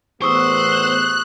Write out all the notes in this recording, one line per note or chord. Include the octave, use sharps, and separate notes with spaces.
A1 E2 B3 C5 C#6 D#6 E6 F#6